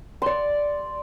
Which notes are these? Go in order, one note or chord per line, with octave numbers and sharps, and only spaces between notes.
D5 C6